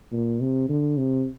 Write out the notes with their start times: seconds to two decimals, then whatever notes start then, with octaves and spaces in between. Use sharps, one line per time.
0.13 A#2
0.41 C3
0.69 D3
0.98 C3